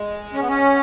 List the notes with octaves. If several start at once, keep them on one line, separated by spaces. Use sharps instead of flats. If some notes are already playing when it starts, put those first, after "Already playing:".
Already playing: G#3
C#4
B3
C#4